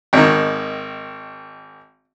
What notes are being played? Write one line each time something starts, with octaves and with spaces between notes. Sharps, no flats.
G#1 D#3